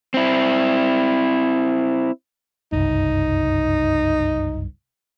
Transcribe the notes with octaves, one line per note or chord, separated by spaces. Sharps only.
C4 E4
F#1 C2 G2 D#4